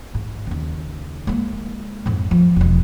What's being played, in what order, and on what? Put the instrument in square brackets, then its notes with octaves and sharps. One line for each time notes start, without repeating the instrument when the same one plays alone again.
[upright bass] G#2
D#2 C#3
G#3 A#3
F2 G#2
F3
E1 G#3